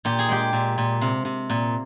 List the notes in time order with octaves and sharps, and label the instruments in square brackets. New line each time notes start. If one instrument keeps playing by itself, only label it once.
[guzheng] A#2 G4
G#4
G#3 G4
A#2
A#2
C3
C3
A#2